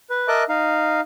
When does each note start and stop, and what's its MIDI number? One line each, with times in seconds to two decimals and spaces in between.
0.10 0.28 71
0.28 0.43 70
0.28 0.43 75
0.28 0.43 76
0.28 0.43 81
0.28 0.43 86
0.28 0.43 90
0.49 1.01 63
0.49 1.01 77